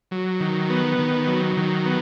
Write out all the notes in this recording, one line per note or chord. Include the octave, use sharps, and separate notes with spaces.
F#3
D#3
B3
D#3
F#3
D#3
B3